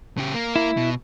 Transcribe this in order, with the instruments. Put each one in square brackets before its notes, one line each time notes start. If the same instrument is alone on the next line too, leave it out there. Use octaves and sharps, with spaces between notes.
[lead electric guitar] C#3 G4
A#3
[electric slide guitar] E4
[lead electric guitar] B2